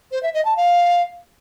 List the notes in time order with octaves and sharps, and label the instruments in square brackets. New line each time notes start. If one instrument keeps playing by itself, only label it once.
[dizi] C5
E5
D#5
A5
F5